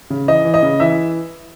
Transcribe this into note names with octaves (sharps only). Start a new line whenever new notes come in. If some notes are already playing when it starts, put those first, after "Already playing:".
C#3
E3 D#5
E3
D#5
C#3
E3 E5